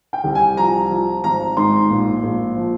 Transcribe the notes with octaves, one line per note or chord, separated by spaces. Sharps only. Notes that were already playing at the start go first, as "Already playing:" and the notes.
G5
C2
G#5
F3 A#5
F3
G#1 A#5
G#2 C6
A#1
A#1
F3